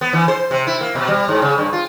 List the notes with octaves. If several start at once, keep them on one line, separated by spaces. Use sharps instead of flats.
B3
E3
C5
C3
E4
A#3
B2
G3
G#2
C#3
G2
F4